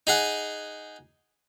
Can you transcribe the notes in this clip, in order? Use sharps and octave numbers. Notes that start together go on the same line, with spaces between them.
D#4 G#4 F#5